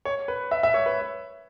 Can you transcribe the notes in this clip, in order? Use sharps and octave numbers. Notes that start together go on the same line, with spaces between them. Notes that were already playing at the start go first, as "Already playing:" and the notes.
C#5
B4
E5
E5
C#5
B4